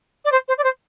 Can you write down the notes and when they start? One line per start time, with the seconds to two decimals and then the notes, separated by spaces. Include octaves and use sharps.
0.25 D5
0.32 C5
0.48 C5
0.58 D5
0.64 C5